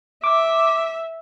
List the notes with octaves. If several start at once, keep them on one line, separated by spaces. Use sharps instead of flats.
E5 D6